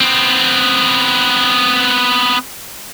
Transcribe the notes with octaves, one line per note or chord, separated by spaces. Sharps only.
B3 C4